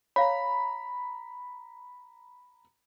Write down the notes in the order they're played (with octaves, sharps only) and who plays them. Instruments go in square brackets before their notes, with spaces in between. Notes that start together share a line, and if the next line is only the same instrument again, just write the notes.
[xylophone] C#5 F5 [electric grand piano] A#5 B5